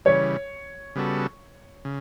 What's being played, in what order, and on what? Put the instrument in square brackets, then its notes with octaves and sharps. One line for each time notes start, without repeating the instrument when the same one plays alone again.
[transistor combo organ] C#3 E3 G3 [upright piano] C#5
[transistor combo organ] C#3 G3 B3 F#4 A4
C#3